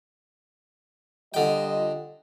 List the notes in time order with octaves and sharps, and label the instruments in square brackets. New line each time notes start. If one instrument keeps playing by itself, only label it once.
[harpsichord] D3 G5 [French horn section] G3 F4 D#5